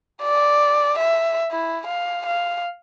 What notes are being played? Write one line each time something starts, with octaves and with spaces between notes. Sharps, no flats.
D5
E5
E4
F5
F5